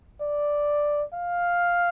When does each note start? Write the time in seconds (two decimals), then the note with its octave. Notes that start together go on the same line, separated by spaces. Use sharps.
0.21 D5
1.13 F5